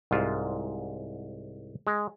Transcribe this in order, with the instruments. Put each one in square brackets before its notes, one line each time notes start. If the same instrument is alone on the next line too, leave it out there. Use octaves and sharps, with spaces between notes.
[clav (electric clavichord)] C2 G#2 F4
G#3